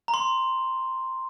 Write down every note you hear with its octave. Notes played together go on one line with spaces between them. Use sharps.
A#5
C6